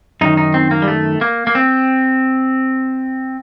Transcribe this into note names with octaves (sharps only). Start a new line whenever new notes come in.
F#2 D#3 D#4
D#4
C4
A#3
G3
A3
A#3
A#3
C4